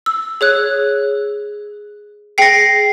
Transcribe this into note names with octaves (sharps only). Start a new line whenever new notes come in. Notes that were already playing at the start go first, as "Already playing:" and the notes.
E6
G#4 C#5 F#6
G#4 G5 A#6 C7 C#7